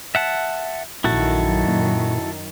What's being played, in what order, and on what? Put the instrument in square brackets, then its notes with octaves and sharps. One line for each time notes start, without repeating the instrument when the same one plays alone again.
[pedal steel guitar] E5 F#5 A5
[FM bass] A#1 [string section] F#2 D#3 [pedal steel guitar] E4 F#4 A4
[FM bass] A#2